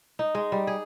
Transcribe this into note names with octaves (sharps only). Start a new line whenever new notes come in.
D#4
G#3
G3
G#4